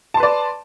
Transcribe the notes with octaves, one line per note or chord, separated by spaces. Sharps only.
B4 D5 A5 C6